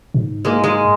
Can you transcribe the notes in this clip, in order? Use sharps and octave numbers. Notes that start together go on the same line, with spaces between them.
G#2
G#3 A#3
G#3